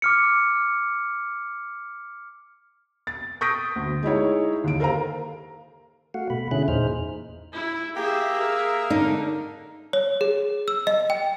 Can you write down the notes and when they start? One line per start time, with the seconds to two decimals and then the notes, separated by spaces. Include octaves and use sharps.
0.02 D6 F6 C#7
3.07 A6
3.41 C#6 D#6 G6 A#6 B6 D7
3.76 D2
4.03 G#3 D#4 E4 C#5
4.64 D#2 D7
4.80 A4 A#4 C5 F5 A#5
6.14 A3 F#4 F5 F#5
6.30 B2 A3 B5
6.51 D3 C#4 E4 G#4 E5 F#6
6.68 E2 A#2 D#4 G#4 C5 F6
7.53 E4
7.96 A#3 G4 G#4 E5
8.40 A#4
8.90 D3 D#4
9.93 C#5
10.21 G#4
10.68 E6
10.87 D#5
11.10 G5